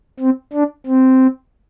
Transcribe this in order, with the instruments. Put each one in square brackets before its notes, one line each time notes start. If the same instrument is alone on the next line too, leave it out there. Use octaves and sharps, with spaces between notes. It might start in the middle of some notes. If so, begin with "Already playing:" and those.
[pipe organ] C4
D4
C4